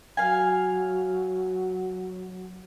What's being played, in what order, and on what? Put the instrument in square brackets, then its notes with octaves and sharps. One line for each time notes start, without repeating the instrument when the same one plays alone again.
[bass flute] F#3 [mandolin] F5 G#5